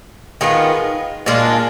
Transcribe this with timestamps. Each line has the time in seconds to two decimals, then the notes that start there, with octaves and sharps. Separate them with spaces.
0.41 D#3 G#3 B3 F4
1.26 A#2 G#3 D4 F4